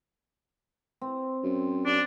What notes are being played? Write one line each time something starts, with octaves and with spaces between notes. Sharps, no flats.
C4
F#2
F#2 D4